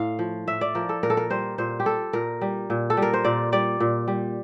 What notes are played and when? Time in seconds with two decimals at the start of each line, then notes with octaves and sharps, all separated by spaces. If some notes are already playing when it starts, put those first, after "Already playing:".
Already playing: A2 F5
0.19 F3
0.48 A2 E5
0.61 D5
0.75 F3 A#4
0.89 A4
1.03 A#2 A#4
1.10 A4
1.17 A#4
1.30 G3 C5
1.58 A#2 C5
1.80 G4
1.85 G3 A4
2.13 A#2 A#4
2.41 G3
2.70 A#2
2.90 A4
2.97 G3
3.02 A#4
3.14 C5
3.25 A#2 D5
3.52 G3 D5
3.80 A#2
4.08 G3